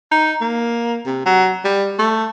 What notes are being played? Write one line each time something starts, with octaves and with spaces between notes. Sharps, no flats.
D#4
A#3
C3
F#3
G3
A3